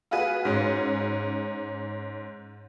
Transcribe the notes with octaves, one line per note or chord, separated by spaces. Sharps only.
F4 F#4 G#4 B4
G#2 C#4